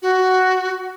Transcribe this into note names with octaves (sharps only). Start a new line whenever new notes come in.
F#4